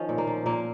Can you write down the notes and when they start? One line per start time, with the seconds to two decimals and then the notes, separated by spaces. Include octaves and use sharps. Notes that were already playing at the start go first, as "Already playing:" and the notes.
Already playing: D#3 F3 C#4
0.09 A#2
0.18 A#3
0.27 F3
0.46 A#2 A#3